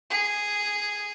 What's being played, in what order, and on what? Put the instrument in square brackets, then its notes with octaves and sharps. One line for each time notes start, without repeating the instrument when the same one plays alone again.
[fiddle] G#4